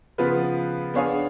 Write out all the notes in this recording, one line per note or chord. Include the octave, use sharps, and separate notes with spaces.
C#3 F3 B3 F4 B4
B3 D4 G#4 C#5 F5